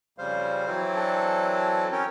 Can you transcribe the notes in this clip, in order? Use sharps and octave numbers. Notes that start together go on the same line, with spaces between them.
F2 C#3 G3 C5 F5
E3 F#3 C4
D4 A4 A5
C#4 A#4 C#5 G5